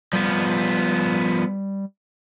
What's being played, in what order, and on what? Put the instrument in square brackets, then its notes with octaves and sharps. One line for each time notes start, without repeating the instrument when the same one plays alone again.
[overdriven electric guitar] F3 B3 [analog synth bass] G3